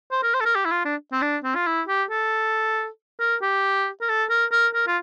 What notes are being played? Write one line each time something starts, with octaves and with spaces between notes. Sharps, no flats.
C5
A#4
C5
A4
A#4
G4
E4
F4
D4
C4
D4
C4
F4
E4
G4
A4
A#4
G4
A#4
A4
A#4
A#4
A#4
F4